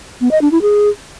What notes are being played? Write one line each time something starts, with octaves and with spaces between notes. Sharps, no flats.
B3
D#5
D4
E4
G#4